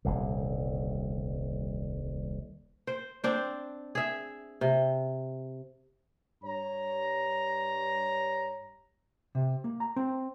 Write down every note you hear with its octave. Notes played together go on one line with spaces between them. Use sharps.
D#1 C2 D3
C5
C4 D4 C5
G#4 E5
C3
G2 C#5 A#5
C3
A#3
A#5
C4